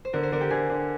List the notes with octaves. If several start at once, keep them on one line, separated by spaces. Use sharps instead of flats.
C5
D3 A#4
C5
D3 A#4
G4
D3 G#4
D3